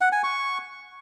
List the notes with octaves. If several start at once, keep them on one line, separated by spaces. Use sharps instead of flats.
F#5
G#5
C#6